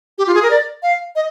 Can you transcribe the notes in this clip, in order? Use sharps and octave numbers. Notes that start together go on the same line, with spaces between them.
G4
F4
G#4
A#4
D5
F5
D#5